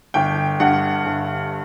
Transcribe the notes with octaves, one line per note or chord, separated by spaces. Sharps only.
G1 G5
G2 F#5
G1